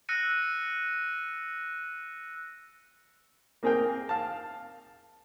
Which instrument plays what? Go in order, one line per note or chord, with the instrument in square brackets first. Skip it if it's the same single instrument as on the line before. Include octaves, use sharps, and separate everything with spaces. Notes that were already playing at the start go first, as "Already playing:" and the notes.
[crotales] E6 F#6 A#6 C#7 D#7
[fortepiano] A#3 C4 G#4 A#4 G5
F5 A5